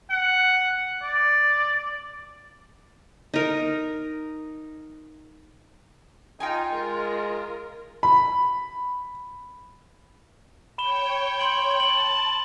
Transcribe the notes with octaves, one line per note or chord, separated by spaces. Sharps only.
F#5
D5
D#4 A#4
D#4 F4 G5 G#5
G#3 A#4
B5
C#5 G5 B5 E7 G7
C6 D7 F#7
A5 F#7